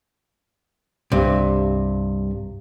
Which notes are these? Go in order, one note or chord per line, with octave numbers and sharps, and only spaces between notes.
C2 G2 C3